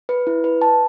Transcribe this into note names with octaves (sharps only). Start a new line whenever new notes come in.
B4
E4
B4
A5